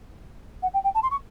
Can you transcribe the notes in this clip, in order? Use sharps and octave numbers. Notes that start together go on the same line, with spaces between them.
F#5
G5
G5
A5
C6
C#6